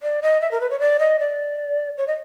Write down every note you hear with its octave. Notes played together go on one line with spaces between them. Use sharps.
D5
D#5
E5
A#4
B4
C#5
D5
D#5
D5
C#5
D#5